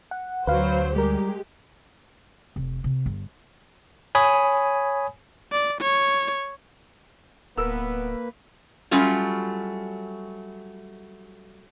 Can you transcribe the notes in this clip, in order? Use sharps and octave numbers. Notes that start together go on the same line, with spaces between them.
F#5
D2 F#3 B4 C5 F5
G3 G#3 G4 A#4
F1
C3
G1
C#5 G#5 B5 D#6
D5
C#5
D1 A#3 B3 A#4 B4 E6
F#3 G3 A3 C#4 F4